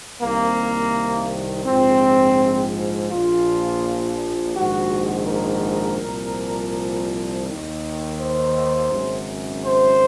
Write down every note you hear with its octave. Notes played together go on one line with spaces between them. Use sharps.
C2 C3 D#3 A#3
A#1 G#2 F3 C4
A#1 A#2 F3 F4
A#1 G#2 D#3 F#4
A#4
C2 A#2 F3
D#2 D#3
C5
G#1 F#2 C#3
C5